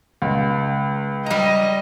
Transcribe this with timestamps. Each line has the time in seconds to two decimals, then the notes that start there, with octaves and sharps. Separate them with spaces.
0.22 C#2
1.26 G3 D#5 A#5